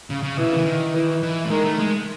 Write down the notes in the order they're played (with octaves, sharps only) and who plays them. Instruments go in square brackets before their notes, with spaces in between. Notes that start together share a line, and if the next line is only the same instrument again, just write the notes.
[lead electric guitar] C#3
C#3
[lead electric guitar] B2 [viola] E3
[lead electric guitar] C#3
E3
D#3
[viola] E3
[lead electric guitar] E3
A3
[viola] D#3 [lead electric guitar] G#3
[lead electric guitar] A3
G#3